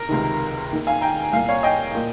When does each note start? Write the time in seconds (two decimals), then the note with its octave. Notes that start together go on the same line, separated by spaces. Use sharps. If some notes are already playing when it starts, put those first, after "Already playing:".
Already playing: A#4
0.09 C#2 C3 D#3
0.71 D#2 D#3
0.87 F5 G#5
1.01 G5 A#5
1.32 C2 A#2 F5 G#5
1.48 C#5 F5
1.63 D#5 G5
1.95 A#2